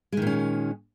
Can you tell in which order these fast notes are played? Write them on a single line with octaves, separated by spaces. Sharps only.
G#3 D#3 A#2 C#4